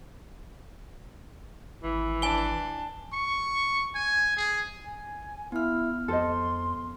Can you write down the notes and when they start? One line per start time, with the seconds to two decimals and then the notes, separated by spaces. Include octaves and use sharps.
1.83 G#1 E3
2.22 D4 G#5 G7
3.13 C#6
3.95 G#5
4.37 G#4
4.85 G#5
5.52 B3 E4 F6
6.08 F2 A4 C5 D#5 C6